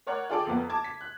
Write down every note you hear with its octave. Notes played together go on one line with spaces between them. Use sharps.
A#4 C#5 D5 F#5
F4 G#4 A4 D5 G5 D6
F2 A#3 B3
A5 D6 G#6
B6
F#6